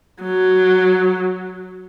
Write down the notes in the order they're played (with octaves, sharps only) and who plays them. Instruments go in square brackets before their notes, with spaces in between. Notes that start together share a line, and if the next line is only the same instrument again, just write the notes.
[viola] F#3